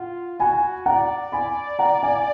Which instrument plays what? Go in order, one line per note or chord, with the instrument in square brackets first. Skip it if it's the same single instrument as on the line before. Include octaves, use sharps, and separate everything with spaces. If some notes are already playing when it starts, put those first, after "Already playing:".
Already playing: [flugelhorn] F4 [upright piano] F#5
[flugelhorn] F#4 [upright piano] G#5 B5
[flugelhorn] D5 [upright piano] F#5 A#5
[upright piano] G#5 B5
F#5 A#5
F5 G#5